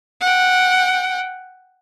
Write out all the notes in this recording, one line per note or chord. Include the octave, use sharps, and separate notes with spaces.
F#5 G5